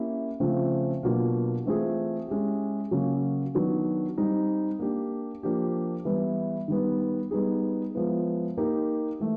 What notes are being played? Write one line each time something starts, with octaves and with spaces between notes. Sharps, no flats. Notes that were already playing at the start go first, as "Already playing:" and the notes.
Already playing: A#3 C#4 E4 G4
C#3 F3 A3 C4 F4
B2 F#3 A#3 D4 F4
E3 A3 C4 F4 G#4
G#3 C#4 E4 G4
C#3 F#3 A#3 C#4
D#3 F#3 B3 D4
G3 C4 D#4
A#3 D4 G4
F3 A#3 D4 G4
E3 G3 B3 E4
D#3 G3 B3
G3 B3 D#4 G#4
F3 G#3 B3 E4
A#3 D#4 G4 A#4
E3 A3